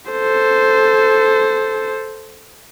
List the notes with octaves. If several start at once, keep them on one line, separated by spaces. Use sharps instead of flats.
A4 C5